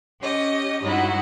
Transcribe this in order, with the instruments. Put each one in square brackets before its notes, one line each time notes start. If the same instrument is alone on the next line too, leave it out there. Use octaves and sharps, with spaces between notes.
[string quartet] C#4 G4 D#5
G2 G#3 D#4 E4 F#4 F#5